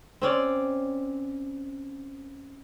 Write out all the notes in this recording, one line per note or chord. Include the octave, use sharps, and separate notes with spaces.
C4 C#4 D5